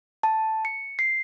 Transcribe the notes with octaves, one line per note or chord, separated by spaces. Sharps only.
A5
C#7
C7